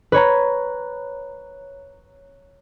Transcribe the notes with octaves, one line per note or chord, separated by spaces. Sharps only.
B4 C#5 A#5